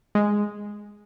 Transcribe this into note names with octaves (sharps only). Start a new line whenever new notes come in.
G#3